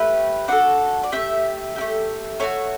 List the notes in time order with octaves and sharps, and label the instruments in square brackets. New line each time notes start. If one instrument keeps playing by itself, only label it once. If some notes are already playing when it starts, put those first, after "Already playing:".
Already playing: [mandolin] A3 G4 B4
D4 F#4 A4 F#5
D5
A3 D4 G4 E5
E4 G4
A3
A3 D4 F#4 C#5